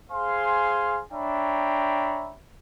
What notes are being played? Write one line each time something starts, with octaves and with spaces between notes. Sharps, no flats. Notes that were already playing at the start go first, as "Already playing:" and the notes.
G#4 C5 F5 G#5 C6
D4 C#5 E5 G5 A#5 B5